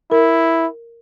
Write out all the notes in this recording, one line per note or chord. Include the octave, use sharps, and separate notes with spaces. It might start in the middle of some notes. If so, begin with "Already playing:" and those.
E4 A#4